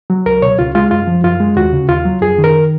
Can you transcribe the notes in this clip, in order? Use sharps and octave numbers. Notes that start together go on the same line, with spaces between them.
F#3
C#2 A#4
B2 C#5
C#2 F4
G#3 F4
F#2 F4
F3
F#2 F4
G#3
D#2 F#4
C#3
D#2 F4
F#3
F#2 G#4
D#3
A#4